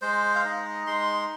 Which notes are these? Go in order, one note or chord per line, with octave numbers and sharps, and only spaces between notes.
G#3 C5
F5
D#4 D#5
G#3 C6